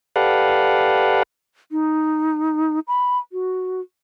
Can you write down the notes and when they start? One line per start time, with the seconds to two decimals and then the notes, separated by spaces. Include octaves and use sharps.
0.16 G4 A4 B4 D5 F5 F#5
1.72 D#4
2.87 B5
3.32 F#4